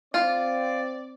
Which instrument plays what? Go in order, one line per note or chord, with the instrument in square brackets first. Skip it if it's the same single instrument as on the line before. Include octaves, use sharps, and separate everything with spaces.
[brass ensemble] C4 D5 [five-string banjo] F4